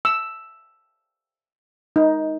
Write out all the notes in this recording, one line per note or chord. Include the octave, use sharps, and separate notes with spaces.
E6
D#4